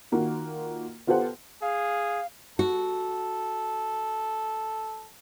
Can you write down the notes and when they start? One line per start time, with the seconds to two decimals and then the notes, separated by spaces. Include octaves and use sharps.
0.12 D#3 A#3 F4 F#4
1.07 B3 F4 G4 A4 C5 F#5
1.62 G#4 F5
2.59 F#4 A4